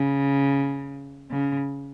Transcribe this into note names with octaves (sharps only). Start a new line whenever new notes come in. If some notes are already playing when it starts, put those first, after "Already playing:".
Already playing: C#3
C#3